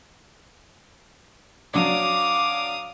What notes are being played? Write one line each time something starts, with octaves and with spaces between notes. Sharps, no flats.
F#3 D4 D5 F5 D6 D#6